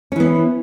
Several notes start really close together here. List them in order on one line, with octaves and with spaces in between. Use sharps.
C#4 E3 B3